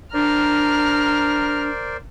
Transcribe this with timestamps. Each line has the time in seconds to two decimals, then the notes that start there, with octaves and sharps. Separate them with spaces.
0.14 D4 A#4 C5 D5 A#5 F6